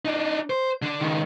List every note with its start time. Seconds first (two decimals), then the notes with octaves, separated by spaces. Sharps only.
0.05 D4 D#4
0.50 C5
0.82 D3 D4
1.00 C#2 D#3